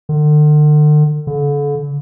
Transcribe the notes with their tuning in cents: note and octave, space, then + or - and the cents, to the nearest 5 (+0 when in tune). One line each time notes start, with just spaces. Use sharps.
D3 +40
D3 -35